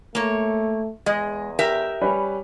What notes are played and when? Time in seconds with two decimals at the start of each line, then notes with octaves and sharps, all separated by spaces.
0.15 A3 A#3 C#5
1.06 E2 G#3 D#5
1.59 G4 A#4 E5
2.01 G3 C#4 B4